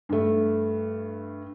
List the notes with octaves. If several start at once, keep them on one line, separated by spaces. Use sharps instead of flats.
G2 A3